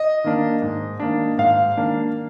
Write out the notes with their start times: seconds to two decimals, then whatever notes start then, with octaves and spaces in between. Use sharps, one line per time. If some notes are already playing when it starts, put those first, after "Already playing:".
Already playing: D#5
0.24 D#3 A#3 D4
0.62 G#2
1.00 D#3 A#3 D4
1.38 G#2 F5
1.77 D#3 A#3 D4